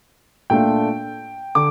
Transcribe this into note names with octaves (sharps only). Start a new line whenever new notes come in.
A#2 A3 D4 F4 G5
D3 D6